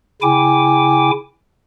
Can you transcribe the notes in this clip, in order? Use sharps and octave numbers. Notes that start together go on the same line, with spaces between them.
C#3 E4 G5 G#5 D6